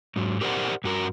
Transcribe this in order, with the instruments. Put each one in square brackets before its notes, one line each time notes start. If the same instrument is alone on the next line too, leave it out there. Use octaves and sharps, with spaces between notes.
[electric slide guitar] G#2 F#3
G4 A#4 C5 D5 F#5
G2 F#4 A#4